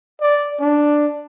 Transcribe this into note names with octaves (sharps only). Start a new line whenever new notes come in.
D5
D4